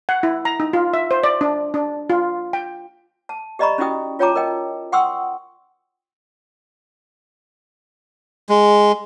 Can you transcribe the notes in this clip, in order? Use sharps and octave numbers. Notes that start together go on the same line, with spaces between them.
F#5
E4
A#5
D#4
F4
E5
C5
D5
D4
D4
F4
G5
A5
G4 D5 D#5 A#5 B5 C#6
C#4 D#4 E4 F#4 G5 D#6
F4 C#5 G5 A5 A#5 D6
A#4 D#5 G5
F#5 G5 C6 C#6 D#6 E6
G#3